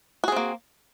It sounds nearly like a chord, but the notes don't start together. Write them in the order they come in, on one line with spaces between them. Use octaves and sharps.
F#4 G#4 C4 A#3